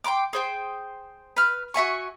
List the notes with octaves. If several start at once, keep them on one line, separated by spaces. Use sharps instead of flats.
G5 B5 C6 D6
G#4 C5 G5
B4 F6
F#4 E5 G#5 C#6